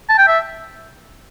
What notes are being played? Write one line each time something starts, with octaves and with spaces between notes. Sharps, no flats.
A5
G5
E5